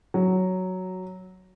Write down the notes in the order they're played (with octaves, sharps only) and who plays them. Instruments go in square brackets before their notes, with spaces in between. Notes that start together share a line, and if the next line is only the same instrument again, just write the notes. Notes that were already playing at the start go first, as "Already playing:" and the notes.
[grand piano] F#3